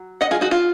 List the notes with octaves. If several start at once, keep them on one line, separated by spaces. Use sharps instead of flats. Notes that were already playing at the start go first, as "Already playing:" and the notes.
Already playing: F#3
D#5 F#5
F4 G#4
D#4 F#4
F4